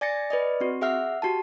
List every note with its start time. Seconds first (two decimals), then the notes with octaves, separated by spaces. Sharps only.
0.01 D5 G#5 A6 A#6 C#7
0.30 B4 D5 D#5
0.60 C4 F#4
0.81 G#4 E5 F#5 F6
1.22 F#4 G4 A5